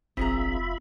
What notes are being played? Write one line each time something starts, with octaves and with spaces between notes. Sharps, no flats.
F1 A#1 C4 F4 G#4 E5 A#5 B5